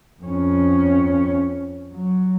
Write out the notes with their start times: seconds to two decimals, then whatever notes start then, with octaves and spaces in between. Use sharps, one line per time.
0.23 F2 C#4
1.93 F#3